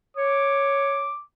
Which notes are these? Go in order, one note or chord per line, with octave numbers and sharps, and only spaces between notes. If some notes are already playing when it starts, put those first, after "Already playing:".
C#5 D6